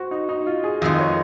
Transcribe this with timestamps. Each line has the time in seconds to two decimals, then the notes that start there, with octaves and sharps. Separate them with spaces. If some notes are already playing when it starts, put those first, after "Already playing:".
Already playing: F#4 C5
0.11 D#4
0.29 D#4
0.47 F4
0.64 G#4
0.81 F2 D#3 G#3 D#5
1.00 C#5